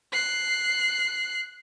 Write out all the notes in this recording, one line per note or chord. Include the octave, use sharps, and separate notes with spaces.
F#6 C7